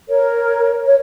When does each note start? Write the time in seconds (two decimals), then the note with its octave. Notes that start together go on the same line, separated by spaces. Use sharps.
0.08 A#4 C#5
0.86 C#5